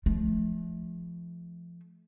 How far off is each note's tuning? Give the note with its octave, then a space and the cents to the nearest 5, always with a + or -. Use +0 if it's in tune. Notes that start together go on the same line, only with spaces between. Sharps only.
F3 -25 A3 -40